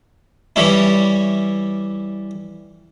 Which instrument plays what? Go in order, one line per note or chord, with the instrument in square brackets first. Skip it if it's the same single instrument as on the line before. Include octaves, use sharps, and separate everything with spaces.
[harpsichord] E3 G3 C#4 E4